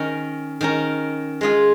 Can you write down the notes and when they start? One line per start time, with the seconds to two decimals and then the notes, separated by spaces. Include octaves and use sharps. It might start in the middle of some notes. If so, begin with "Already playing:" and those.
Already playing: D#3 C#4 A#4
0.61 D#3 C#4 A#4
1.41 G#3 F4 G#4